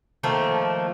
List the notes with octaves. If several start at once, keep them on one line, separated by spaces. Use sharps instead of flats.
D#3 F3 A3 A#3